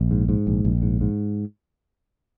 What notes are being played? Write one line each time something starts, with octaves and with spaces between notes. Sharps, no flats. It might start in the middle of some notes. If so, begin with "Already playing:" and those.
Already playing: A#1
G#2
G#2
A#1
A#1
G#2
G#2